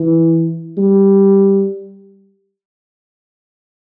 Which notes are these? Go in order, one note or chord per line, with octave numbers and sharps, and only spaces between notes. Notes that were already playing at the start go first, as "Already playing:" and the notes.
Already playing: E3
G3